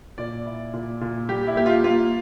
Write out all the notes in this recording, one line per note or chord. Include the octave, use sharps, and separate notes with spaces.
A#2 D5
E4
A#2
A#2
G3 G4
E4
A#3 G4
F4
A#3 F4